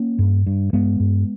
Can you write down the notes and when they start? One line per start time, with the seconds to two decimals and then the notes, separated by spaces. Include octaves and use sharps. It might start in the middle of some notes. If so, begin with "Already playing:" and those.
Already playing: A#3 C#4
0.19 G2
0.47 G2
0.73 G2 G#3 B3
1.00 G2